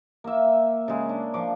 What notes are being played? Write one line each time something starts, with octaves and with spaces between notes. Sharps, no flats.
A#3 E5
C#3 G#3
D4
F3 D6